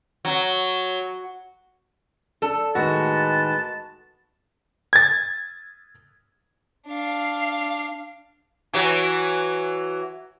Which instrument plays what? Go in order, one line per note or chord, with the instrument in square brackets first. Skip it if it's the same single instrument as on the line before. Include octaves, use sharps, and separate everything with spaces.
[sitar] F#3
[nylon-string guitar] D4 [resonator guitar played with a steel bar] A4
[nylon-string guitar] A2 D#3 [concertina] G#3 B4 [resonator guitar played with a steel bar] F#4 [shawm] A5
[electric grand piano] G#6 A6
[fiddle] D4 F5
[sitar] E3 F#3 F#4